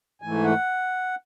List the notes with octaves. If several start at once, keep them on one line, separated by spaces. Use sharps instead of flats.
G#2 E3 A3 G#5
F#5